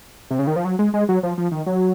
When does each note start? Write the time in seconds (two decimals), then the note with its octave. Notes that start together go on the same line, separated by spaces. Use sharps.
0.31 C3
0.39 C#3
0.47 D#3
0.56 F3
0.65 F#3
0.79 G#3
0.94 G#3
1.09 F#3
1.23 F3
1.38 F3
1.52 D#3
1.66 F#3